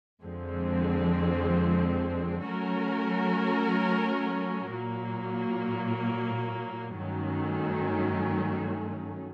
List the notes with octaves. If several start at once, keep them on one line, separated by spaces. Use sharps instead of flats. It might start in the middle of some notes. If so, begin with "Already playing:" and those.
F2 D3 F3 G#3 C4
F#3 A3 C#4 F#4 A#4
A#2 F#3 A#3
G2 D#3 F#3 A3 C#4